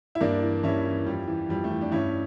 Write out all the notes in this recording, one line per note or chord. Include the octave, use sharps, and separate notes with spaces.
E4
G2 A#3 D4
E3
G2 C#4 E4
E3
F2 G3
E3
F2 G3
A3
E3
D4
G2 C#4 E4